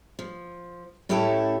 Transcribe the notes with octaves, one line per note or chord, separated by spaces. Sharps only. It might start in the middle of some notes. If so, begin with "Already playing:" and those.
F3
A2 C#4 E4 G4 A4